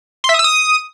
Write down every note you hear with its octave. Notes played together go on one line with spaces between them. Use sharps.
C6
E5
D#6
E6
D#6